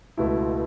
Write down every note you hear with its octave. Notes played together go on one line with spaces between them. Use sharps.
C#2 B2 A3 E4